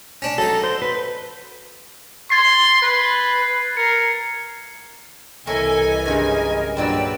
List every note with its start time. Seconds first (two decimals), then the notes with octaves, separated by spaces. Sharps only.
0.22 C#4 D4
0.38 F#3 D#4 A4
0.63 C5
0.82 B4
2.30 C6 G#6 A6 C7
2.82 B4
3.77 A#4 C7 C#7
5.47 C2 E3 A4 A#4 C#5 D#5 E5 G#5
6.06 G2 C#3 G#3 A#4
6.77 G2 A#2 F#3 B4 D5 G5 E6